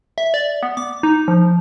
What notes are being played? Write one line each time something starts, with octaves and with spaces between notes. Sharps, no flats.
E5
D5
B3
D6
D#4
F3